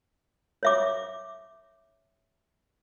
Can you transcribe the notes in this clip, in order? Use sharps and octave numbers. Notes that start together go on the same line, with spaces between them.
C#5 E5 D6